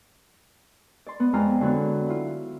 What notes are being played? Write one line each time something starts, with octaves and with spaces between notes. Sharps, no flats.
D5 C6
B3
F2 G#3 F4 D5 A#5 F6
D3 F#3 B3
E4 F4